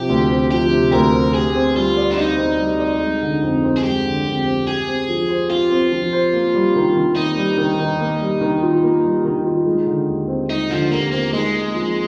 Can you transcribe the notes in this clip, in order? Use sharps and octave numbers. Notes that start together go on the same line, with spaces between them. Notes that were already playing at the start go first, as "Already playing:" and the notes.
Already playing: C3 F3 G4
D2
C4
F3 G4
C3
D2 A#4
C4
G4 G#4
C4
G3 F4
D5
D4
D#4 G4
C4
G3
D5
G#3
D3
F2
C4
G#4
G#3 G4
D3
F2
C4
G4 G#4
C4
F3
C5
F4 G4
C4
F3
C5
A#3
G3
D#3
D#3
A#3 D#4
G3
D#3
D#3
A#3
G3
D#3
F4
A#3
G3
D#3
F4
G#3
D3
D#2
C4
G#3 D#4
D3 F3
D#2 A#3
A#3 C4
G#3 D#4
A#3
F3